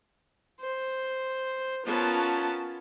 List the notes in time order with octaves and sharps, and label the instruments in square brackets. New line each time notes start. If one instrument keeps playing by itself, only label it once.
[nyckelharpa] C5
[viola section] B3 C#4 A5 [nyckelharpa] F4 A#4